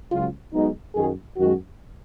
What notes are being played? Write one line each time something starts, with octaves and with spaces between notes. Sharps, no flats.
C#2 C#3 F#3 F4
B1 B2 G#3 D#4
F#2 D#3 F#3 G#4
F#2 D#3 G#3 F#4